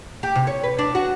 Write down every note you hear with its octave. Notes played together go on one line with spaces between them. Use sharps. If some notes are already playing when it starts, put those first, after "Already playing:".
G4
C3
C#5
B4
D4
F#4